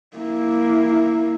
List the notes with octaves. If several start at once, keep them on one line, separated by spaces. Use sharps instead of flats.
A#3 E4